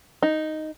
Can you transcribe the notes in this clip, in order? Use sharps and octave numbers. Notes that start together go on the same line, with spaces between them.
D#4